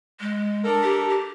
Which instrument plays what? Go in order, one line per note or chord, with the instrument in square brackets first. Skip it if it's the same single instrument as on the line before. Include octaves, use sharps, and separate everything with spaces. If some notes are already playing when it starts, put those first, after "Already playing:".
[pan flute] G#3
[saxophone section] D4 A4 A#4
[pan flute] G4
G4